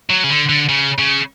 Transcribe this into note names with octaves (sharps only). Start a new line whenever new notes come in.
F#3
C#3
D3
D3
C#3
C#3